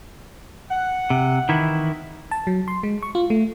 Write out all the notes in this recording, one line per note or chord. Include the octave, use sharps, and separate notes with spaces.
F#5
C3
D#3 E3 E4
A5
F#3
C6
G#3
C#6
F4
A3